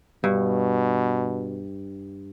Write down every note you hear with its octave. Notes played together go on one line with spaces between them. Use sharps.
G2 B2